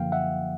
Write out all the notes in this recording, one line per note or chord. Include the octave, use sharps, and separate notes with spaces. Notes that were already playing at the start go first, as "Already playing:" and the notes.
Already playing: F#2 D3 F3 A#3 F5 G5
E5 F#5